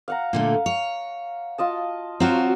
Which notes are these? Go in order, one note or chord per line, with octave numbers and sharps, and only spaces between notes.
F5 F#5 A#5
A#2 D3 A3
C#5
F4 D#5 A5
F#3 C4 F4 F#4